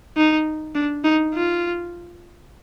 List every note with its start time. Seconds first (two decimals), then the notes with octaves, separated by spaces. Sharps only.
0.17 D#4
0.75 D4
1.04 D#4
1.34 F4